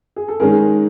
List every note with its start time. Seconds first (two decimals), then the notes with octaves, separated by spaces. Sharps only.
0.16 G#4
0.28 A4
0.40 G#2 D#3 G#3 C#4 G#4 A#4